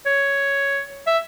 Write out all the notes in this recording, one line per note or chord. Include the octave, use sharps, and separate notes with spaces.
C#5
E5